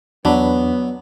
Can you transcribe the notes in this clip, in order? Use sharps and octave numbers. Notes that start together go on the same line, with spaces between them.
E2 F#3 B3 D4 B5